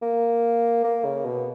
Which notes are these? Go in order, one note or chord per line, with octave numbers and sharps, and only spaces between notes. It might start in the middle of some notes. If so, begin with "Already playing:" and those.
A#3
A#3
C#3
B2